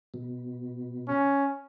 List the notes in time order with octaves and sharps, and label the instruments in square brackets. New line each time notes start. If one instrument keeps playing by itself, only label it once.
[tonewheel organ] B2
[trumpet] C#4